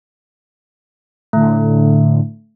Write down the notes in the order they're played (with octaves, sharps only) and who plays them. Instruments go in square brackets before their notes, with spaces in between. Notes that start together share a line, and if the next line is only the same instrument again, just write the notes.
[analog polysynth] A2 D3 [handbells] A3